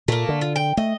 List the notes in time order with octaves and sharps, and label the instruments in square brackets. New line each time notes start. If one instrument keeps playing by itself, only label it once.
[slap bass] A#2 [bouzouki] A3 A#3
[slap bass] D3
[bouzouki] F4
G5
[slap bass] A3 [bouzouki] D#5